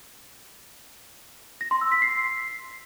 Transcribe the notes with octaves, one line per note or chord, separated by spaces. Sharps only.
A#6
C6
E6
B6
C7